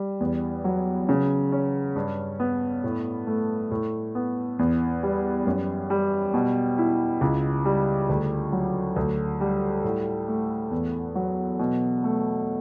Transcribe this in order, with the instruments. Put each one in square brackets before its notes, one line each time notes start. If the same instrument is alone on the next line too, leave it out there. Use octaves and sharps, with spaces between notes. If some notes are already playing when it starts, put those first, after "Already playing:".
Already playing: [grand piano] G3
E2
F#3
C#3
C#4
G2
B3
A2
A3
A2
B3
E2
G3
F#2
G3
B2
E4
C#2
G3
D2
F#3
D2
G3
A2
A3
E2
F#3
B2
A3